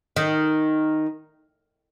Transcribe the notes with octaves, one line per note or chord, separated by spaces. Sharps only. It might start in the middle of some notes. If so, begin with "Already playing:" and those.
D#3